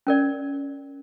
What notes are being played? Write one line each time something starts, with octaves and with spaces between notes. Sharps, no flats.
C#4 A#4 D5